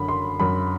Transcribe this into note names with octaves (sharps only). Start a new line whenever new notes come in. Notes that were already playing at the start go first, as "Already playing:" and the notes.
Already playing: F#2 D3 B5
C6
F#2 B5